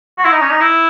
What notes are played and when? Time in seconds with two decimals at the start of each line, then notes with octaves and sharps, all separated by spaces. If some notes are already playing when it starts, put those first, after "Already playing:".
0.18 F#4
0.25 E4
0.32 D#4
0.41 C#4
0.51 D#4
0.60 E4